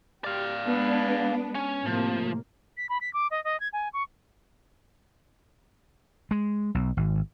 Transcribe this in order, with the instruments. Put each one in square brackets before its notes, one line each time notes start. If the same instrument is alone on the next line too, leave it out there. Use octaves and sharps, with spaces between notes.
[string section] G4 [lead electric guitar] D5 F5
[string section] G#3 B3 D4
[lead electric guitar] C#4
[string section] A2 C3 A#3 [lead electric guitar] F3
[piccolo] B6
B5
B6
D6
D#5
D#5
G#6
G#5
C#6
[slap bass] G#3
B1
G#1